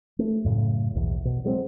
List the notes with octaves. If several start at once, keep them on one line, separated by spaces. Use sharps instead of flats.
A3
F#2 A2 C#3
F#1 B1 E2
B2
F#3 G#3 B3 C4